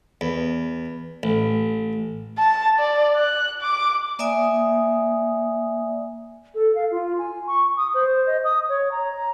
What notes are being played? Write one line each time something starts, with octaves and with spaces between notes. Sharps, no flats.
E2
A1
A5
D5
F#6
D6
A#3 D5 E5 G#5 D#6
A4
F5
F4
G#5
C#6
D#6
C5
D#5
D#6
C#5
A#5